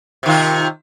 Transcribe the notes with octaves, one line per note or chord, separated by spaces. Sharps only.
C3 D#3 F4